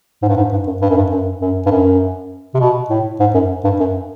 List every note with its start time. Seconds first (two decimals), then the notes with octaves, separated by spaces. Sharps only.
0.22 G#2
0.29 G2
0.37 G#2
0.52 G2
0.67 F#2
0.81 G2
0.90 F#2
0.97 G2
1.11 F#2
1.41 F#2
1.66 G2
1.71 F#2
2.54 C3
2.60 B2
2.90 A2
3.20 G#2
3.34 F#2
3.64 G2
3.80 F#2